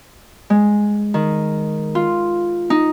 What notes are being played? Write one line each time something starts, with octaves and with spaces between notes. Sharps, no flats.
G#3
D#3
F4
D#4